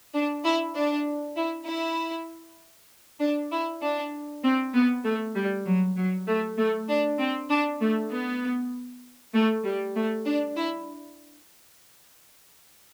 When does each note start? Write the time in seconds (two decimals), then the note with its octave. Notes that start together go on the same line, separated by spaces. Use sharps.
0.14 D4
0.44 E4
0.76 D4
1.37 E4
1.67 E4
3.20 D4
3.52 E4
3.82 D4
4.44 C4
4.74 B3
5.04 A3
5.36 G3
5.66 F#3
5.97 F#3
6.28 A3
6.57 A3
6.89 D4
7.19 C4
7.50 D4
7.80 A3
8.11 B3
9.34 A3
9.65 G3
9.96 A3
10.26 D4
10.56 E4